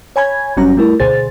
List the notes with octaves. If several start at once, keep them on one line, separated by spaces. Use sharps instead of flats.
C#5 G#5 B5 G#6
G1 F#3 G3 C#4 F#4 A#5
G3 A3 E4 A#4
D2 B2 G#4 C5 A6